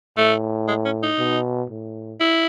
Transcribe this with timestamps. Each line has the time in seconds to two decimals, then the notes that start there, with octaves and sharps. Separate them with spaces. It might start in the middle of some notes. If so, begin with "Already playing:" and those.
0.17 A2 A3
0.68 G#3
0.85 C#4
1.03 D#4
1.19 B2
1.70 A2
2.20 E4